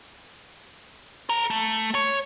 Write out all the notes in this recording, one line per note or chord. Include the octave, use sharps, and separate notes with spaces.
A4 A#5
A3
C#5